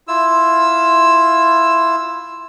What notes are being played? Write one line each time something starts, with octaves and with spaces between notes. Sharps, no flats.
E4 F4 E6